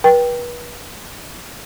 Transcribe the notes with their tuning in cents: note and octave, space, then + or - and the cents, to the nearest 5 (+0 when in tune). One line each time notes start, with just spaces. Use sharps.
B4 -35 G5 +0